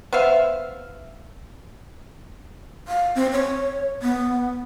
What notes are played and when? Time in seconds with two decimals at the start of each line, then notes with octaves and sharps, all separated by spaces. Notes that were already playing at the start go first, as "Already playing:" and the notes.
0.13 B3 C5 E5 F5
2.88 F5
3.15 C4
3.32 C#5
4.02 B3